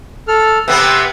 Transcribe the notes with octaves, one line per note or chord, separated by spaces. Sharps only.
A4 F6
C3 B3 C4 B4 E6